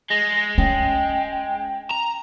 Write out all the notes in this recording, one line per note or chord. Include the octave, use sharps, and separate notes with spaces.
G#3 A#6
C#4 G5
A#5